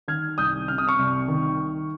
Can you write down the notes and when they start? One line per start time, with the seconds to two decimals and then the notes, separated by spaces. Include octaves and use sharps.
0.08 D#3 F6 G#6
0.38 C2 D#6 G6
0.68 C3 F6
0.78 D#6
0.88 C#6 F6
0.99 C2
1.28 D#3